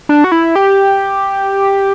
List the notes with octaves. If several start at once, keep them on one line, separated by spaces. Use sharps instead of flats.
D4
F#4
E4
G4